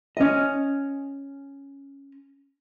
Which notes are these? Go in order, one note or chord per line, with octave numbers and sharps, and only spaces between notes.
C#4 D#5